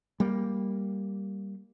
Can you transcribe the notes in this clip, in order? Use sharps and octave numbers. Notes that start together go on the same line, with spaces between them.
G3 A#3